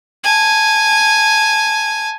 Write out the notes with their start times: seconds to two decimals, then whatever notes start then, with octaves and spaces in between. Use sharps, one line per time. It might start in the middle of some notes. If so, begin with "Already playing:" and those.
0.24 G#5 A5